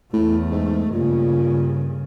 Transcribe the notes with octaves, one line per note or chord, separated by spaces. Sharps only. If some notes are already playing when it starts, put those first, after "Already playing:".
E2 A2 A3
G#2
G2 A#2 C#3